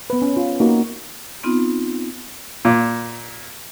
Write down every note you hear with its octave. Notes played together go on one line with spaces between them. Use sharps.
B3 B4
C#4
F4
A#3 D#4 F#4
B3 C4 D#4 F4
A#2